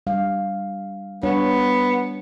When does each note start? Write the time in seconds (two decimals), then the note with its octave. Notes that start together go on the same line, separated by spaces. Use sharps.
0.07 G3 D4 F5
1.23 G3 B3 D4 C#5